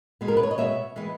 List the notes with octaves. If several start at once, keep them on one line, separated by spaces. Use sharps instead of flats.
B2 G#3 B3
A#4
B4
C#5
D#5
B2 G#3 B3 C#5 E5
E3 G#3 B3